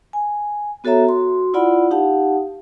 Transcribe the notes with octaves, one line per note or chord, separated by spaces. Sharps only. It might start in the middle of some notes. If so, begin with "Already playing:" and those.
G#5
B3 F#4 A4 C#5 E5 A#5
F#4 C6
E4 F4 D5 F#5 B5
D#4 G4 F5 F#5 A5